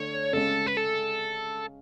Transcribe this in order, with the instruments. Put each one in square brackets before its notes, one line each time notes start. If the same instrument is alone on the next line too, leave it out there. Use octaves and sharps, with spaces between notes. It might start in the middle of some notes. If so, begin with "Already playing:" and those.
Already playing: [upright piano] D3 A3 [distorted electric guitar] C#5
[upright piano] C#3 G#3 C#4 [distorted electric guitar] A4
[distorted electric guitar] B4
A4